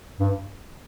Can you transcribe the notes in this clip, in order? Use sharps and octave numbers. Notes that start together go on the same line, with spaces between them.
G2